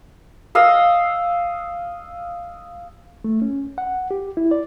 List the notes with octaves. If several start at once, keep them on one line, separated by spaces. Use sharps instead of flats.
D#5 F5 E6
A3
C#4
F#5
G4
E4
D5